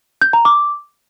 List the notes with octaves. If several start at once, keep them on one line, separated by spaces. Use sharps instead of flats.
G6
A#5
D6